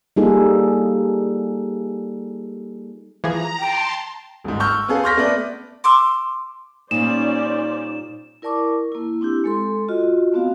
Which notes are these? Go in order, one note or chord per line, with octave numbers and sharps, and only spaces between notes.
G3 A#3 D#4 F4 G#4 A4
E3 F3 G#4 A#5
G5 A5 C6
G1 G#2
C#6 E6 F6 G6
B3 C#4 G#4 A4 F5
C6 C#6 F6 G6 A#6 B6
A3 B3 A4 B4 D5
C6 D6 E6
A#2 G3 C#4 D#4 C5 D5 E7
E4 A#4 D5 A5 C#6 D6
A#3 E4
C4 D4 E4 G4
G#3 A4 C6
F4 F#4 D#5
A3 B3 C4 F#4 F5